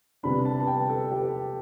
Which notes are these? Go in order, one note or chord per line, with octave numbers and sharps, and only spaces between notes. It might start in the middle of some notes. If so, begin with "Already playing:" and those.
C3 G3 B3 D4 B5
A5
A5
G5
A4
G4